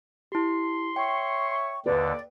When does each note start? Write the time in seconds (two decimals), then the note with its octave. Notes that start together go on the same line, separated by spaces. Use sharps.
0.32 E4 G4 C6
0.96 C#5 E5 G5 C#6
1.86 D#2 D3 B4 D5